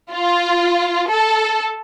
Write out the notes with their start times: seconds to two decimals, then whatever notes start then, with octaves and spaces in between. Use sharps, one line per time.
0.12 F4
1.10 A4